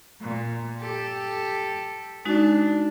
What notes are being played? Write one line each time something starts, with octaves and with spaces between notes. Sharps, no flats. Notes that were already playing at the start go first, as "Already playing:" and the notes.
A#2
G4 A4
G#3 D4 D#4 F#4